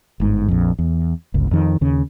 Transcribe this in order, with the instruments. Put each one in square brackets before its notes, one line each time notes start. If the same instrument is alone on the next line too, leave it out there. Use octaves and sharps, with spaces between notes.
[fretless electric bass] G1 G#2
A#1 F2
E2
G1 C#2
F2 D#3
D#2 C#3